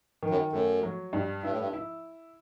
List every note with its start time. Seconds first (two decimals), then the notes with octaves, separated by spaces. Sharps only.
0.23 D#3
0.30 F#2
0.53 F#2 A3
0.83 F#3
1.13 G2
1.43 G2 E4
1.51 A2
1.59 G2
1.73 E4